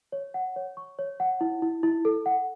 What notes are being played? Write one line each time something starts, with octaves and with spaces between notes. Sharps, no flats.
C#5
F#5
C#5
C#6
C#5
F#5
E4
E4
E4
A4
F#5